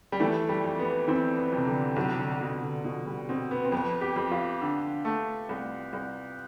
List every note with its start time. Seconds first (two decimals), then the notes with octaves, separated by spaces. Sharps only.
0.12 G3
0.20 E3 A3
0.49 G3
0.64 F2
0.79 B3
1.08 E3 C4
1.37 B3
1.52 F2 C3
1.67 D3
1.96 B1 C3
2.19 D3
2.41 B2
2.63 D3
2.84 B2 F3
3.07 G3
3.29 B2 C4
3.51 B3
3.65 C4
3.72 F2 B3
4.01 G4
4.16 F2
4.31 F4
4.61 D3
5.05 A3
5.49 C2
5.93 C2